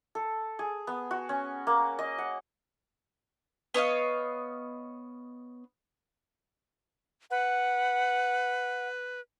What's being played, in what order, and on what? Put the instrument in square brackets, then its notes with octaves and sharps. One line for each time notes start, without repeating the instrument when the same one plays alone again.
[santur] A4
G#4
B3
F#4
C#4
A#3
D#5
F#5
[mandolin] B3 C#5 D#5 F5
[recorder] B4 [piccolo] F#5